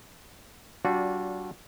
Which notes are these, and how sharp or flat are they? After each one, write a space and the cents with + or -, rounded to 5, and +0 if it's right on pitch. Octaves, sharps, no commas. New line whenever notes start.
G3 -45 D4 -30 F#4 -35